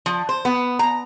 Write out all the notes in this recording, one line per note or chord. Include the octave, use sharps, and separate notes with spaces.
F3
C5
B3
A#5